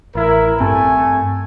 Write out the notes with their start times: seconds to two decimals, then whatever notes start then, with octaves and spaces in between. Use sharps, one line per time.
0.15 A1 E4 A#4
0.60 G2 A3 C4 A4 G#5